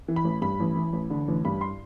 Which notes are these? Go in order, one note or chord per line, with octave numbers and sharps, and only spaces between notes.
E3
B5
A1
G2 B5
A1
E3
A1
D3
A1
G2 B5
C6